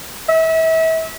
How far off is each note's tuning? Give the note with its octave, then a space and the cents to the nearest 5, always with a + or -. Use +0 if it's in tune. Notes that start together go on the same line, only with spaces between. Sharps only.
E5 -35